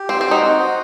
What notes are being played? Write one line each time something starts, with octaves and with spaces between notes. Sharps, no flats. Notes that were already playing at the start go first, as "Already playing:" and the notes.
Already playing: G4
C4 C5
C4
F#4
D#4
C5
F#4